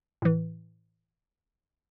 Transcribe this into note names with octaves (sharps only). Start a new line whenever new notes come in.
A2 E3